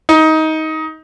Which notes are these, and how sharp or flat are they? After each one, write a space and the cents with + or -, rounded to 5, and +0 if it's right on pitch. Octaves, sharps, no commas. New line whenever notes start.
D#4 +20